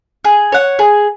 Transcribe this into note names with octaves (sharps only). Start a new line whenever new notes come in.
G#4
C#5 F#5
G#4